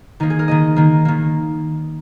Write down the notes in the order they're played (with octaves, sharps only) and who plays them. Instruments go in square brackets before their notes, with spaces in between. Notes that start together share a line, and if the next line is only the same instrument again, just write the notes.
[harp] D#3 A#3 D#4
G#4
A#4
D#3 A#3 D#5
D#3 A#3
D#3 A#3